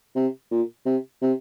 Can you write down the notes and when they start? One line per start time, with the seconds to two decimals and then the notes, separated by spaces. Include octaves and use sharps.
0.16 C3
0.51 A#2
0.86 C3
1.22 C3